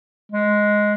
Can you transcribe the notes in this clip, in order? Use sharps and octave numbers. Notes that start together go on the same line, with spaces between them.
G#3